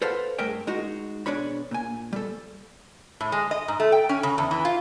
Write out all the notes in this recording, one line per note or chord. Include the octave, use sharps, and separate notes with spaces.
A4 B4 C5 F5 F#5 A5
G2 A3 G#4 A#4 E5 G5
G#3 D#4 F#4
B2 D4 G#4 C#5 B5
A#2 G#5
G3 A4
A2
G#3
D#5
G#2
A3
G5
C#4
C#3
E2
E3
F4